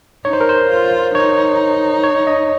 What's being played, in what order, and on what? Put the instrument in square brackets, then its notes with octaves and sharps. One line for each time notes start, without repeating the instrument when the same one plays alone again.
[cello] D#4 [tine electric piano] C#5
[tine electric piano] C5
A#4
C5
[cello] F4
[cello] D#4 [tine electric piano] C#5
[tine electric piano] C#5
D#5